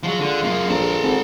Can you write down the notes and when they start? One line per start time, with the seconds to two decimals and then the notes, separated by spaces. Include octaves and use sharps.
0.03 F3 F#3 G#3 F4
0.20 D3
0.42 F#2 A#3
0.70 A#1 A4 A#5
1.03 G#1